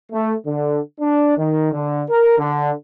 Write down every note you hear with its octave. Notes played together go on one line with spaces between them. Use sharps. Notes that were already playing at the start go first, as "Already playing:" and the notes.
A3
D3
D4
D#3
D3
A#4
D3